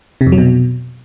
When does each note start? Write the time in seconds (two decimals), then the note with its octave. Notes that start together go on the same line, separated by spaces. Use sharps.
0.21 C3
0.26 F2
0.32 F#3
0.38 B2